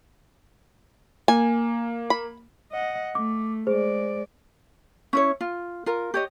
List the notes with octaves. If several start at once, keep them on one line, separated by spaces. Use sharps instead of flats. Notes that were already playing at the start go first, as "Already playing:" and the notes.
A#3 G#5
B5
D#5 F#5
A3 D6
G#3 G#4 C5 D5
C#4 E4 C#5
F4
F4 A#4
G4 C#5 D#5